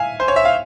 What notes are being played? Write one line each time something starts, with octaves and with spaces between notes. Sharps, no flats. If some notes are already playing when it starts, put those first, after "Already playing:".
Already playing: E5 F5 G#5
C5
C#5
E5
F5